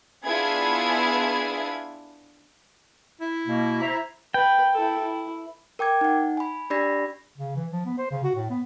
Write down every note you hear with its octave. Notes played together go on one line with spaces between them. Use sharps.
B3 D4 E4 F4 G#4 G#6
E4
B2 A#3
C5 E5 A#5
B4 G5
E4 A4
E4
A#4 G5 D6 G#6
D#4 F#5
G#5 B5
D4 G4 D5 B5 A#6
C#3
E3
F3
B3
C5
C#3
F#4
A2
B3